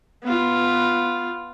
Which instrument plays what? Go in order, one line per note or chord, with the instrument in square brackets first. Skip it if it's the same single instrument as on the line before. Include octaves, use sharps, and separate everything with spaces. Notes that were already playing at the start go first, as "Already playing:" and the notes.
[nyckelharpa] B3 F4